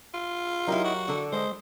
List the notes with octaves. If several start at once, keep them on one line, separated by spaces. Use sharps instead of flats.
F4
F#3 D#4 E4 G4 A#4
F#4
D3 A4
G#3 C5 D#5